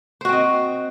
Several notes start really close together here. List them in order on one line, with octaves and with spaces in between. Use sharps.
C5 F#4 C4 D#5